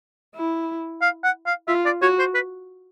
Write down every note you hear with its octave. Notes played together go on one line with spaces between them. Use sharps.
E4
F5
F#5
F5
F4 E5
D5
F#4 C#5
C5
B4